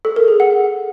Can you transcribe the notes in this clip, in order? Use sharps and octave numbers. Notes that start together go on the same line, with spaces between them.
A4
A#4
G#4
F#5